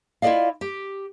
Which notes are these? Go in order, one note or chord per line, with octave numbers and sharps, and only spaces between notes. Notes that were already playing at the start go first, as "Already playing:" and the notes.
E4 F4 G#4 D5 D#5 F5
G4